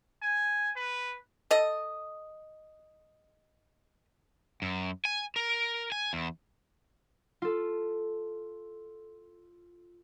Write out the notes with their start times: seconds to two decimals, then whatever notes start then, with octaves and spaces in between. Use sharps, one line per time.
0.22 G#5
0.76 B4
1.51 A4 D#5
4.62 F#2
5.05 G#5
5.36 A#4
5.92 G#5
6.13 E2
7.42 F4 A4